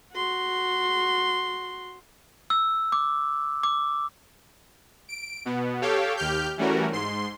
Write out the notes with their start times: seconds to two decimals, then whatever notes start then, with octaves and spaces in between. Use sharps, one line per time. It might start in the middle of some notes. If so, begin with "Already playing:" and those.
0.13 F#4 C6
2.50 E6
2.92 D6
3.63 D6
5.09 D7
5.45 B2 B3
5.81 G4 A4 C#5 F5 G5
6.17 D#2 G4 F6 G6
6.57 E3 G3 A3 C#4 F#4 A#4
6.92 G#2 C6